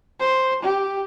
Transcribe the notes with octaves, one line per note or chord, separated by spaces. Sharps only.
C5
G4